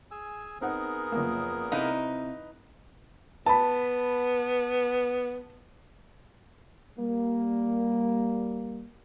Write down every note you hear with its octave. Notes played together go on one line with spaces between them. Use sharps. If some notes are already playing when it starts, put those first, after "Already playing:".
G#4 G#5 E6
B3 C4 D#4 G#4 A#4 F#5
F#1 F3 A#3
C3 D#4 E4 B4 F5
B3 A5 B5
G3 A#3